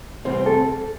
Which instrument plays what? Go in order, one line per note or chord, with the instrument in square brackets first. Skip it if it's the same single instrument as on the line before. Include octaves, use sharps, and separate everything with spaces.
[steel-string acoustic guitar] E2 C3 E3 G3 C4 [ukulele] C5
[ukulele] A4